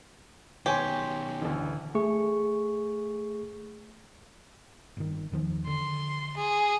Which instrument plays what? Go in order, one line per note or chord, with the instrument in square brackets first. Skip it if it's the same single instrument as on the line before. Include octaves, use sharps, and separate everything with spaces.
[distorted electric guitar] B2 D#3 [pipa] G4 [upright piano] C#5 G#5 C6
[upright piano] A1 D2
[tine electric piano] A3 G#4 C#6
[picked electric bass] G1 D#3
E2 D#3 F3
[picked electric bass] D3 [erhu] C6
[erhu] G#4